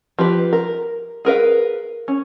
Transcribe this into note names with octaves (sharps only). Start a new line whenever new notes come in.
F3 G4 B4
A#4
G#4 A#4 B4 F5
C#4